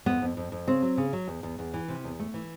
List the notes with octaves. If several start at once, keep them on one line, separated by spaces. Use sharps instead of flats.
F2 B3
F2
F2
F2
C#3 C4
F#3
C#3
F#3
E2
E2
E2
E3
C3
E2
A3
E3